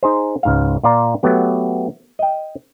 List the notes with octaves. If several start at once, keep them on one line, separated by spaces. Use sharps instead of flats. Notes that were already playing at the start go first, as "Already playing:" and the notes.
D#4 G#4 C5
C#2 G#2 F5
A#2 F4 D5 A#5
F#3 A3 B3 G4
D#5 G5